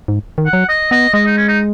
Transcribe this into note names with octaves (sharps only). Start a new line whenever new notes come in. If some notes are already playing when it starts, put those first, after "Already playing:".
G#2
D#3
F#5
F#3
D#5
B3 D#5
G#3 D#5
D#4
C#4
D#4